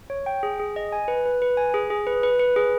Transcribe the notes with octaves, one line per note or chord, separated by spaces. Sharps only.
C#5
G5
G#4
G#4
D#5
G#5
B4
B4
B4
G#5
G#4
G#4
B4
B4
B4
G#4